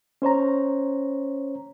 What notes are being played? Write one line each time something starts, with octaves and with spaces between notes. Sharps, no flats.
C#4 C5 C#5 A#5